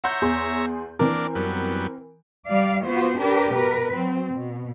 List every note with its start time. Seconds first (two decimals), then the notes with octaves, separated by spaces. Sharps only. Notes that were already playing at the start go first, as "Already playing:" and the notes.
0.04 C#5 E5 F#5 A#5 C6 G6
0.22 E2 G#4 C6
0.99 E3 A#3 C4 D4 A#4
1.35 F#2 G3 B3
2.48 G3 D5 F5
2.84 B3 F4 F#4 C5
3.19 D4 G4 A#4 B4
3.53 B2 A#4 B4
3.92 F#3 C4
4.33 B2